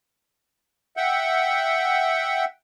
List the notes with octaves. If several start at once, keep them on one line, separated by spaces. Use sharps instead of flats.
E5 F#5 G5